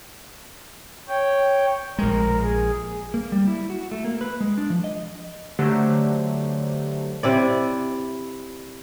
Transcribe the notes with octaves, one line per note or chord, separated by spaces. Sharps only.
C#5 G5
A#1 G#3 A#4
G#4
A#3
G3
E4
F#4
A3
A#3
B4
G#3
D4
F3
D#5
D3 F#3 A3 G4 C5
C3 E4 D5